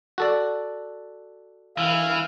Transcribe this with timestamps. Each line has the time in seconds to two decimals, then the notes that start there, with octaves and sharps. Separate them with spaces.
0.18 F#4 A4 D5
1.78 E3 F5 F6